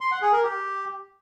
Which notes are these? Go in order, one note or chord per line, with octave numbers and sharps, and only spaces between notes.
C6
F#5
G#4
A#4
G4